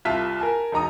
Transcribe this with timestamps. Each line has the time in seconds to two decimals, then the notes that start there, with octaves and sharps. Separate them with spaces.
0.05 C2 F4 E5 A5 B6
0.39 A#4 G#5 A5
0.72 E1 D#4 A#5 D#6